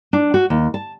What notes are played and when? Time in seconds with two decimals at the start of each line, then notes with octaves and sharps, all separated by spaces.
0.13 D4
0.34 F#4
0.50 D#2
0.74 A5